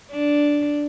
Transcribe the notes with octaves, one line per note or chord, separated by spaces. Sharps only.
D4